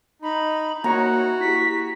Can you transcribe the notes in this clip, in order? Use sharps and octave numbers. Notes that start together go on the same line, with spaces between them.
D#4 B5
A#3 F#4 C#5 A#5 C#7
E4 G4 B6